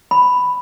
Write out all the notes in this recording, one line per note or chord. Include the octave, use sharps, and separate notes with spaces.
B5